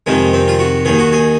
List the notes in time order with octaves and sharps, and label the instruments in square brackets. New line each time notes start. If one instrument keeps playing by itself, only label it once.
[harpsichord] F2 C3 D#3 G#3
C4
F4
F#4
D#2 D#3 G#4
F#4
G#4